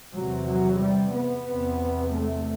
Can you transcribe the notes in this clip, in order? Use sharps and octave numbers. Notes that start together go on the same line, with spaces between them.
E2 C3 F#3
F#3
G3
B3
E2 C3
A3